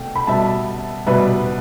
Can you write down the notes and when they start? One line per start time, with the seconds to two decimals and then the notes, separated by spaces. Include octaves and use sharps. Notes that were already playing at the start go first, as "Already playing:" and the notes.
Already playing: B2 A3 G5
0.15 B5
0.27 B2 G3 E5 A5
1.06 B2 G3 B4 E5